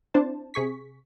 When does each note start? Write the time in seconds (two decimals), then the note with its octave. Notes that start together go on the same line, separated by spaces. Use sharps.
0.14 C4 D4 E4 C5 A5
0.54 C3 G#4 C#6 B6